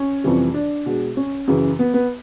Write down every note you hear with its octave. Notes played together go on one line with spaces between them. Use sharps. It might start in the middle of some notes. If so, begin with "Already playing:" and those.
Already playing: C#4
F2 C3 E3 G3
D4
B2 G#3
C#4
F#2 C#3 E3
B3
B3